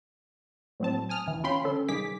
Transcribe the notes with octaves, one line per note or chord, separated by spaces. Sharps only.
A2 F#3 C4 A5
G#5 D#6 F6
D#2 E3
C#4 F4 G5 B5 C6
D3 C#4 A4
C2 D#3 G#4 D6 B6